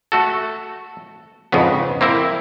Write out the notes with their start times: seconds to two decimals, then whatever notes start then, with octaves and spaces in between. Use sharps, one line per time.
0.12 A3 F#4 A4
1.52 F2 G#2 C#3 B3
2.01 A#3 C4 E4 A#4